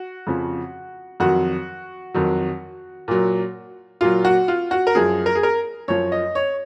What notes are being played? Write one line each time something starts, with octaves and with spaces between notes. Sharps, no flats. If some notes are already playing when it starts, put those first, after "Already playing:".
Already playing: F#4
F2 C#3 F3
F2 D#3 F#3 F#4
F2 D#3 F#3
A#2 F#3
A#2 F#3 F4
F#4
F4
F#4
A#4
F#2 F3 G#4
A#4
G#4
A#4
F#2 F3 C#5
D#5
C#5